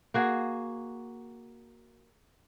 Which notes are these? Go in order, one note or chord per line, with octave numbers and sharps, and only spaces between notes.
A#3 F#4 G#4